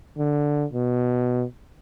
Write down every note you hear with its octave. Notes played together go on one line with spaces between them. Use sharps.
D3
B2